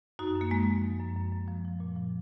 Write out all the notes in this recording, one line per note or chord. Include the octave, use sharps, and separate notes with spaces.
F#2 D#4 F#4
F#2
A#3
F#2 G#3
F3
F#2
F#2
F#2
F#2
F3
F3
A#2
F3